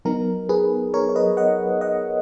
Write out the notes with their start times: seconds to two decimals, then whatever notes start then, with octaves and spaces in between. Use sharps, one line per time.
0.05 F#3 B3 D#4 A#4
0.49 G#4 B4
0.94 A#4 C#5
1.09 C#5
1.16 B4 D#5
1.37 D#5 F#5
1.81 D#5 F#5